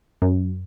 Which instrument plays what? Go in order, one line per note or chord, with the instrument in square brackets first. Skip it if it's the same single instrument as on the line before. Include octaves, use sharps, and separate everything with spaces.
[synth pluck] F#2